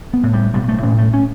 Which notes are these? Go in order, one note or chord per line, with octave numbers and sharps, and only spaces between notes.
B3
A2
G3
B1 G3
A3
A2 C#4
A3
C#4